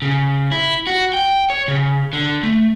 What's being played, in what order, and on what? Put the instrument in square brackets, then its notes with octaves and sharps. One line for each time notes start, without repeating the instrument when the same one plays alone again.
[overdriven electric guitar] C#3
E4
F#4
G5
C#5
C#3
D3
A3